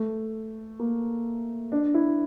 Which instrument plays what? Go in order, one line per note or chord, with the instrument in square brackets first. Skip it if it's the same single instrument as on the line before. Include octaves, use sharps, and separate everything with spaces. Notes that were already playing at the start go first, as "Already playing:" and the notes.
Already playing: [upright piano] A3
A#3
D4
E4